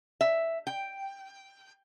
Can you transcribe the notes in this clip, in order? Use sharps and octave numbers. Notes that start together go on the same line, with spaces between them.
E5
G5